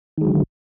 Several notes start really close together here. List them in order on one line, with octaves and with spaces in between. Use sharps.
D#3 G#3 F#3 D3